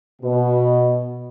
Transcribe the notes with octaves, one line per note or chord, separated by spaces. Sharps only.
B2